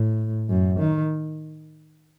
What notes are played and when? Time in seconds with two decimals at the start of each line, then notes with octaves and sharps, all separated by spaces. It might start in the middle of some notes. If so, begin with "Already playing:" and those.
Already playing: A2
0.50 F#2
0.80 D#3